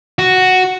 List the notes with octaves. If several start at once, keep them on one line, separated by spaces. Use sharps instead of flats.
F#4